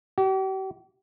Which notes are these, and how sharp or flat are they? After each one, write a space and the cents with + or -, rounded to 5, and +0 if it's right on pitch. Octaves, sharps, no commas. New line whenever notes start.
G4 -45